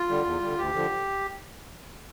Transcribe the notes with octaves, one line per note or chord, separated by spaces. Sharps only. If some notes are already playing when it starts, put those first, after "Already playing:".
Already playing: F4
D3 G3
E2
D3 G3
D2 G4
D3 F3